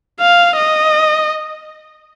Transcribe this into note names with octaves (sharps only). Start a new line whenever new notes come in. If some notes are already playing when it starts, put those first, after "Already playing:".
F5
D#5